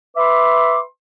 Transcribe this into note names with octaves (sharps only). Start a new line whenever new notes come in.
B4 E5 B5 C6 D6